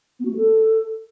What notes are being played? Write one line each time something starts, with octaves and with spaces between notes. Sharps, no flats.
B3
F#4
A3
A4